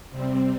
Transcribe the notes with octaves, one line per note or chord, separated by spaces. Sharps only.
C3 G3 C4